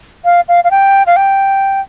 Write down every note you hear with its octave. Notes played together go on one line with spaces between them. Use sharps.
F5
F5
F5
G5
F5
G5